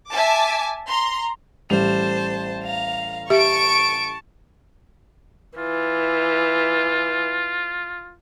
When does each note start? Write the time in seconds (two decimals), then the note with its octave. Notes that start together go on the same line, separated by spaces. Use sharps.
0.10 E5 G#5 A5 D6
0.87 A#5 C6
1.70 A1 G3 C5 A5 F7
2.63 F5 A#5
3.30 G4 E5 A5 C#6 D7
5.58 E3 F4